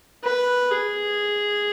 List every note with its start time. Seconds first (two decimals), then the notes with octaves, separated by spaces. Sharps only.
0.24 B4
0.71 G#4